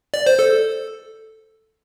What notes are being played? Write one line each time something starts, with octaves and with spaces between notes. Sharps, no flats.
D5
C5
A4